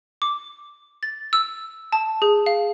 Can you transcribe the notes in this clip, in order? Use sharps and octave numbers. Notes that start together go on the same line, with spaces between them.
D6
A6
E6
A5
G#4
F5